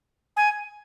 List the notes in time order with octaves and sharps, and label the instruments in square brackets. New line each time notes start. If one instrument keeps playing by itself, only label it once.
[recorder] G#5